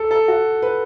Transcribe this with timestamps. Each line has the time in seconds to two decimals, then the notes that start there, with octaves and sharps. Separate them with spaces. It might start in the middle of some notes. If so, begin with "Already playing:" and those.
Already playing: A4
0.11 A4
0.28 F#4
0.62 B4